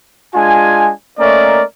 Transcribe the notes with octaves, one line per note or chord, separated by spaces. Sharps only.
G#3 D4 F4 G#5
A3 A#3 C#4 A#4 D5 D#5